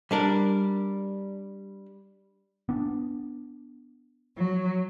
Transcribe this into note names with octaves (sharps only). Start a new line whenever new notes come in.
G3 D4 A#4
B3 D4
F#3